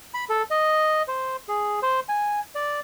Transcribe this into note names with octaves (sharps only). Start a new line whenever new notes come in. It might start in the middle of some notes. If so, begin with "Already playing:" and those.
B5
A4
D#5
C5
G#4
C5
G#5
D5